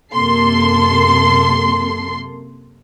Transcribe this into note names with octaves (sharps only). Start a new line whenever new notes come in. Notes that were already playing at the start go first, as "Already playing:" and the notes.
F#2 C3 A#3 A4 C6 C7